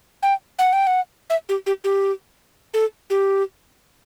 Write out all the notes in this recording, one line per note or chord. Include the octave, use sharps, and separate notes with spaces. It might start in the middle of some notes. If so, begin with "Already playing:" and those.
G5
F#5
G5
F#5
E5
G4
G4
G4
A4
G4